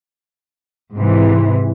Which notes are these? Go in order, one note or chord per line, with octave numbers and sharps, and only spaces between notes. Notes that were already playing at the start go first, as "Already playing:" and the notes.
G#2 C3 E3